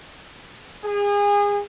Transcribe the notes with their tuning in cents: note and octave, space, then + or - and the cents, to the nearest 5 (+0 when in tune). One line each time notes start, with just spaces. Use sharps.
G#4 -30